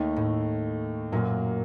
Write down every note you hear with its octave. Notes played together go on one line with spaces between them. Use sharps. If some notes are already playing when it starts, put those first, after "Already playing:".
Already playing: D#2 D#3 A3 D#4
A2
F#2 A#2 F#3 A#3 F#4